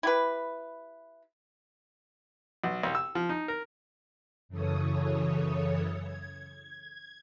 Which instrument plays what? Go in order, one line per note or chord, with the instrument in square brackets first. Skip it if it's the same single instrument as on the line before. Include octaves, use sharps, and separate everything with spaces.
[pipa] E4 G4 B4
[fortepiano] B1
C2
E6
F3
D#4
A#4
[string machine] F#2 C#3 E3 A4 C#5 D#6
G#6